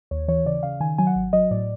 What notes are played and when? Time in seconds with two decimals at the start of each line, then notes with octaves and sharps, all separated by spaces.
0.11 D#2 C#5
0.28 E3 C#5
0.46 C#3 D5
0.63 C#3 F5
0.80 D#3 G#5
0.98 F#3 G#5
1.07 F#5
1.16 G#1
1.33 F#3 D#5
1.51 A2 D5